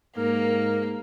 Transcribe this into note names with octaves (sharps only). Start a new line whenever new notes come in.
G#2 A#3 A#4